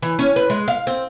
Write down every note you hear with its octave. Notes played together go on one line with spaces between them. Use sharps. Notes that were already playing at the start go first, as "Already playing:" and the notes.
E3
C#4
B4
G#3
F5
C4